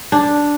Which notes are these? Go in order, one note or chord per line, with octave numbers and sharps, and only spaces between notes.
D4